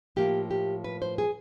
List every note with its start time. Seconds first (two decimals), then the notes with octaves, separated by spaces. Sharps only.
0.16 A2 F3 A#3 G4
0.51 G4
0.84 B4
1.02 C5
1.18 G#4